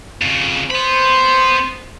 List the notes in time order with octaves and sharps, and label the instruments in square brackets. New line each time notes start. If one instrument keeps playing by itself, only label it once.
[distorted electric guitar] F2 C#3
[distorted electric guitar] B3 B5 [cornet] C5